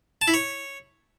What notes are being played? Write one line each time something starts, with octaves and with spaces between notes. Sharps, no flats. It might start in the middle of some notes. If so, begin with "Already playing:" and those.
A5
E4
C#5